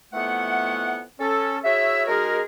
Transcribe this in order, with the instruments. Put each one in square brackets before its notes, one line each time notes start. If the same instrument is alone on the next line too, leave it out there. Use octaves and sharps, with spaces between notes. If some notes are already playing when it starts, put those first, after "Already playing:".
[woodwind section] F2 E3 A3 B3 F#5
C#4 A4
E4 F#4 G#4 C#5 E5
G#3 D#4 F#4 G#4 A#4